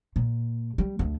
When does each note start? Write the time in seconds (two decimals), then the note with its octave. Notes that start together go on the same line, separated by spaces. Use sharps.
0.16 A#2
0.78 G3
0.99 D2 A3